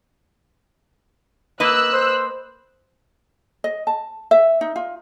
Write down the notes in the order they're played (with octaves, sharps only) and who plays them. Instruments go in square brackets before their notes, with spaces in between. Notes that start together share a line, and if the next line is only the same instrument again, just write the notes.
[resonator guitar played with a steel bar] A#3 B4 D#5 [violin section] E6 F#6
[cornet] C5
[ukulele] D#5
A5
E5
D#4
F4